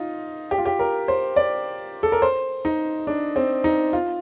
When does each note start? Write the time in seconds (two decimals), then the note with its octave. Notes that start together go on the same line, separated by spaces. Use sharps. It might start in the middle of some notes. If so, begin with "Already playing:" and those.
Already playing: D#4 F4
0.51 G4
0.58 F4
0.66 G4
0.79 A#4
1.08 C5
1.36 D5
2.03 A4
2.12 A#4
2.22 C5
2.65 D#4
3.07 D4
3.36 C4
3.64 D#4
3.93 F4